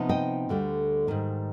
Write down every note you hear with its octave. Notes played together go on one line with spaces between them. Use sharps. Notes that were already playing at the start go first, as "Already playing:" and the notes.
Already playing: C3 F3 B3 D#4
D#5 G5
D2 D3 G3
G#2 D#3 G3